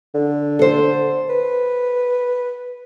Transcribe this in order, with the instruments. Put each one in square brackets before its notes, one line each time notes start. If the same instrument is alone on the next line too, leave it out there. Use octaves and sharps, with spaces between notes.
[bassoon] D3
[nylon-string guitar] A4 C5
[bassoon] B4